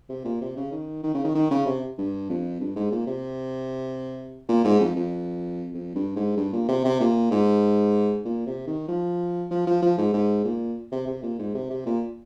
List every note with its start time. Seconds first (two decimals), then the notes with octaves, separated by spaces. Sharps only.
0.09 C3
0.25 A#2
0.41 C3
0.56 C#3
0.72 D#3
1.03 D#3
1.14 C#3
1.24 D#3
1.35 D#3
1.51 C#3
1.66 C3
1.98 G2
2.29 F2
2.60 G2
2.76 G#2
2.92 A#2
3.07 C3
4.49 A#2
4.64 G#2
4.80 F2
4.96 F2
5.74 F2
5.95 G2
6.16 G#2
6.37 G2
6.53 A#2
6.68 C3
6.84 C3
7.00 A#2
7.31 G#2
8.25 A#2
8.46 C3
8.67 D#3
8.88 F3
9.51 F3
9.67 F3
9.82 F3
9.98 G#2
10.14 G#2
10.44 A#2
10.92 C3
11.07 C3
11.23 A#2
11.39 G#2
11.54 C3
11.70 C3
11.86 A#2